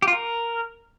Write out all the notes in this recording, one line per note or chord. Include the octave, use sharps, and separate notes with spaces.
G4
F4
A#4